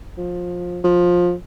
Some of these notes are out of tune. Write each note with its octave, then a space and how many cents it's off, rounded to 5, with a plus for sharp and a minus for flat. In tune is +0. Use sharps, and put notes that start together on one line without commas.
F3 +20
F3 +15